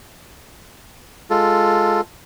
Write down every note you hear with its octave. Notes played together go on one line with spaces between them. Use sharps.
G#3 F4 A4